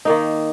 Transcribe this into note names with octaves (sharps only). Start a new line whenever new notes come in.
D#3 A#3 D#4